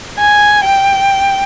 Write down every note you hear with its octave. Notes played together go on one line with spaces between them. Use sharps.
G#5
G5